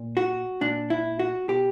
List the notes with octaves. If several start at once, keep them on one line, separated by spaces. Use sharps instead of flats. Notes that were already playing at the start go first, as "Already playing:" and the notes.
Already playing: A#2
F#4
A#2 D4
E4
F#4
B2 G4